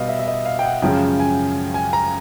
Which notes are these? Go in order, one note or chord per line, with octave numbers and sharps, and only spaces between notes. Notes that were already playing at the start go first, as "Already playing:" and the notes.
Already playing: B2 G3 B3 D5 D#5 F5
E5
E5
D#5
F5
G5
F#5
F#2 C#3 F3 G#3 G5
G#5
G#5
A#5